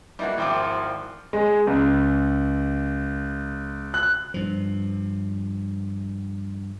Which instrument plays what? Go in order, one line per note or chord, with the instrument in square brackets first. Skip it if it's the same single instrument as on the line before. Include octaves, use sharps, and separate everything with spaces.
[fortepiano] G3 A#3 F#4 [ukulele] D#4 E4 G#4
[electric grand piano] G#1 G5 D6 [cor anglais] F3 [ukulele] E4
[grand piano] G#3
C#2
F#6
[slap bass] G2 F3